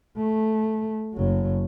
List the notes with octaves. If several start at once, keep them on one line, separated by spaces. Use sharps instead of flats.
A3
F#1 F#3